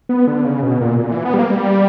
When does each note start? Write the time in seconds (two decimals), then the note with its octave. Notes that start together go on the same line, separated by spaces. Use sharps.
0.09 B3
0.27 D3
0.44 C#3
0.63 B2
0.81 A#2
0.99 A#2
1.11 E3
1.25 B3
1.34 G3
1.39 A#3
1.52 G3